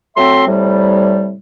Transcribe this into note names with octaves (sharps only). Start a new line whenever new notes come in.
F#3 A3 C4 E5 C6
A2 C3 G3